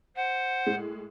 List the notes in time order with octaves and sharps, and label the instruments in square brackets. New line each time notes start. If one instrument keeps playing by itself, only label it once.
[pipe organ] C5 [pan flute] F#5
[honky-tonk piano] A2 G#3